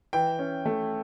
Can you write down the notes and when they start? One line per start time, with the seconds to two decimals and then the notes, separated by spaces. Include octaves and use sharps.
0.13 E3 G5
0.39 C#4
0.65 A3